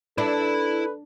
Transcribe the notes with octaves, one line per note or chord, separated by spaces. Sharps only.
D4 E4 A4 B4 B5